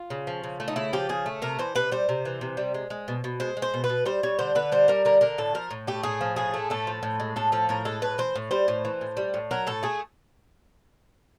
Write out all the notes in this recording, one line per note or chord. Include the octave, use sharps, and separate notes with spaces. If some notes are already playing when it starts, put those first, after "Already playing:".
Already playing: F4
C#3
F3
C#3
A3
D#4
C#3 E4
F3 G4
C#3 G#4
A3
C3 A#4
E3 C5
C3 B4
G3 C5
C3
E3
C3
G3
G#3
G#3
B2
B2
G#3 C5
G#3
C5
B2
B4
B2
G3 C5
G3 C#5
D3 C5
D3 B4
G3 C5
G3 A#4
D3 A#4
D3 A#4
A2 A4
F3 A#4
A2
A3 G4
A2 G#4
F3
A2 G#4
A3
A2 A4
F3
A2
G#3
A2 A4
F3 A4
A2 A#4
G#3 A4
A2 B4
E3 C5
A2
G3 C5
A2
E3
A2
G3
A2
F#3 A#4
A2 A4
A3 G#4